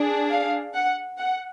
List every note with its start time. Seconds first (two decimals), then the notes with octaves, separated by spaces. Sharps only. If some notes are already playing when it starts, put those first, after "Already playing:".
Already playing: D4 G#4
0.31 F5
0.74 F#5
1.18 F#5